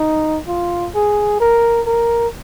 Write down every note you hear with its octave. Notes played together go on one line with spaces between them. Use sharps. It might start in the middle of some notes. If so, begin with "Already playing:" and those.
Already playing: D#4
F4
G#4
A#4
A#4